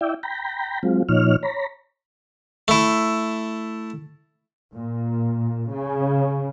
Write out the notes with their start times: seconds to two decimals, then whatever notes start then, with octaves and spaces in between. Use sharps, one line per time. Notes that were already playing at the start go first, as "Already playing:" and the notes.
0.01 E4 D5 E5 G5
0.23 G5 A#5 B5
0.83 F#3 G#3 C4 F4
1.09 A#2 F3 D#4 C#5 F6
1.43 C#5 A#5 B5
2.68 A3 E4
4.74 A#2
5.72 C#3